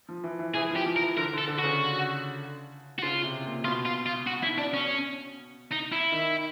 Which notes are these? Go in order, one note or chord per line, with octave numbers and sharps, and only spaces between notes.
F3
E3
E3
E3 G#4
F3
G4
F3
A#4
E3
D3 A#4
D3
A4
D3
F#4
C#3
F#4
C#3 F4
C3
A#2
B2 F4
F4
F4
F#4
E4
D4
C#4
D#4
E4
D#3